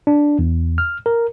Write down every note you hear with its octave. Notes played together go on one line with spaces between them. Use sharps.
D4
E2
F6
A#4